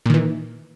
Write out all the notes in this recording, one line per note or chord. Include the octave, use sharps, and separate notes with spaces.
A#2 D#3 E3